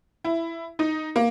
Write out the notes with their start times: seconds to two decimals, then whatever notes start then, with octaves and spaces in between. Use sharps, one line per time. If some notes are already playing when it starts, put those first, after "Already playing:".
0.24 E4
0.79 D#4
1.16 A#3